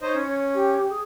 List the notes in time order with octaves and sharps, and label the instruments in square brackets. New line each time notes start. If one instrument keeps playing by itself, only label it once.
[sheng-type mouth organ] D#4 C5 D#5 [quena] C#5
[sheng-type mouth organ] C#4
[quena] G4
G#4